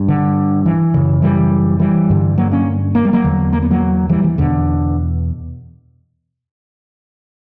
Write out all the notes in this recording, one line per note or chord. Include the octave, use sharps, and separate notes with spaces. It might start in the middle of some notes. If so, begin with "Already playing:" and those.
Already playing: G2
D3
E3
F#2 C#3
E3 G3
E3 G3
G2 D3
F#3 A#3
A#3 C#4
A#3
G3
F#3 A#3
E2 D3
A#3
B3
F#3 A#3
E3 G3
E3
E2 B2 D3